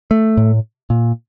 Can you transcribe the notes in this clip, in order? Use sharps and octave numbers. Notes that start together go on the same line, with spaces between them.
A3
A2
A#2